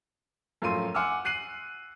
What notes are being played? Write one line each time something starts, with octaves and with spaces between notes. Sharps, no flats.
F#2 A2 F3 C6 D#7
F#5 G#5 C6 D6 E6 F6
F#6 C7 D#7 F#7